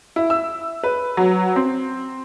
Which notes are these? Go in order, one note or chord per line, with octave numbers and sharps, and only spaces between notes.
E4
E6
B4
F#3
C4